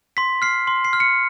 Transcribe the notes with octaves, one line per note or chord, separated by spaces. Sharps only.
C6 B6
F6 C7
C6
C7
F6
C#7